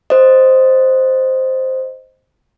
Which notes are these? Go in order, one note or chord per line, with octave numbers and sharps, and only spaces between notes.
C5 D#5